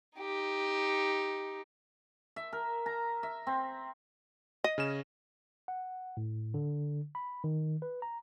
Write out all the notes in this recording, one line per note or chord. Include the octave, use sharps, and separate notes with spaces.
D#4 G4
E5
A#4
A#5
E5
C4
D#5 A#6 D#7
C#3 C#4 E7
F#5
A2
D3
B5
D#3
B4
A#5